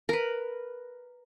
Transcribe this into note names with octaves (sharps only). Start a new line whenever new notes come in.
A#4 B4